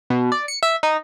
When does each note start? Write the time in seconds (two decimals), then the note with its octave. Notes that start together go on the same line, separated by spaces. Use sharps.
0.10 B2
0.32 D5
0.48 C#7
0.63 E5
0.83 D#4